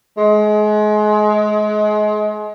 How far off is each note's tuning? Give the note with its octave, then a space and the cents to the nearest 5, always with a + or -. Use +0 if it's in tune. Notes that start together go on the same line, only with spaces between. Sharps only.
G#3 +30